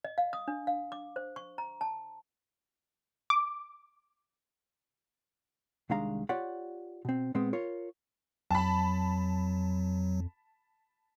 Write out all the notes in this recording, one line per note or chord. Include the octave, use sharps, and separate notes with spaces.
D#5
F5
D#6
D4
F5
D6
C5
C#6
A#5
A5
D6
C2 D#3 G#3 D4 F5 A#5
F4 G4 C#5 D5 F#5
B2 C4
A#2 G#3 B3 C4
F4 A#4 C#5
F2 F#3 A5 B5